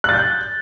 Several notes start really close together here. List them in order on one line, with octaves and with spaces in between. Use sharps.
F#6 A6 G6